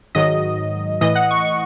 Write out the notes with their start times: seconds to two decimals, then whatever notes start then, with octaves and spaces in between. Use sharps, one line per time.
0.15 G#2 D#3 F#3 D#5
1.01 A2 E3 D#5
1.15 F#5
1.31 C#6
1.45 C#6